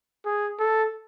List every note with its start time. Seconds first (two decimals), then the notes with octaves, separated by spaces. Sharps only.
0.25 G#4
0.59 A4